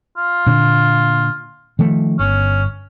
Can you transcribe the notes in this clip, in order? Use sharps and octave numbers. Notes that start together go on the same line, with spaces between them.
F4
A#2 D3 D4
D#3 F3 A3
G1 C#4